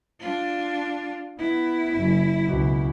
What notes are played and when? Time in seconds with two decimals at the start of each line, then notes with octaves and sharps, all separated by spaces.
0.21 D4 F4
1.39 B3 E4
1.95 F#1
2.46 C#2 B2